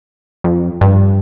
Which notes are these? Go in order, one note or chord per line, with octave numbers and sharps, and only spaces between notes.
F2
G2